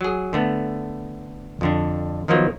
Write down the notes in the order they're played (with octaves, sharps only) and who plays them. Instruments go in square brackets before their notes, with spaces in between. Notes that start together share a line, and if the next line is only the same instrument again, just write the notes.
[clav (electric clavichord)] F#3 G#4
D3 A3 B3
F2 D3 D4
D#3 F3 F#3 A#3 B3